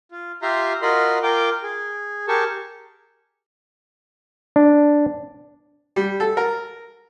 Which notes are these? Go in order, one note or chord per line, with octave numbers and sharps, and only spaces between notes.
F4
F4 G4 E5 A#5 C6
F4 F#4 A#4 D#5 B5 C6
F4 A#4 G5 D6
G#4
G4 G#4 A#4 A5 C#6
D4
G3
A4
A#4